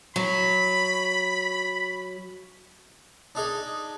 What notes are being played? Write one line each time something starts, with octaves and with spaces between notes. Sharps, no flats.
F#3 B5
D4 D#4 G#4